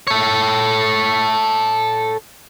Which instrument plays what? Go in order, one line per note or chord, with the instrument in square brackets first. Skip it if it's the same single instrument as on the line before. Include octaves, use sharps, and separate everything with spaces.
[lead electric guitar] A4 C#5